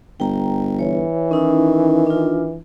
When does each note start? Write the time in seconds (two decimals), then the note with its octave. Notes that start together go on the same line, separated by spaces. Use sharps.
0.20 G1 G5 A#5
0.79 E3 C#5
1.31 D#3 C#4 D#4 E4
2.07 D4 F4